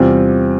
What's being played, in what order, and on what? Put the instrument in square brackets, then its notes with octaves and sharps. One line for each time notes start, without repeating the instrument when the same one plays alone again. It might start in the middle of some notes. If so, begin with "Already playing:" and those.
Already playing: [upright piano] E2 C3 G3 C4 F4